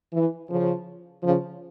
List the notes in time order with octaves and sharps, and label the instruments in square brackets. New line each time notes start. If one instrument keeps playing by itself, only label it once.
[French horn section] E3
C#3 F3
C#3 F3